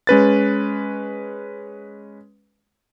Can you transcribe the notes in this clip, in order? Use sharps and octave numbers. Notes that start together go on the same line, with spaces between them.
G#3 C#4 B4 A6